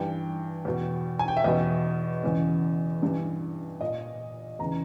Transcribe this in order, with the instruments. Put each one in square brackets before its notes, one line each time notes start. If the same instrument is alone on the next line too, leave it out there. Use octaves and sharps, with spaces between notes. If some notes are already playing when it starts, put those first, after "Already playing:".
Already playing: [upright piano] G2 E3 G5
E2 B2
G#5
G5
E5
E2 B2 D#5
E2 C#3 E3
G2 E3
A#2 D#5
E2 C#3 E3 A#5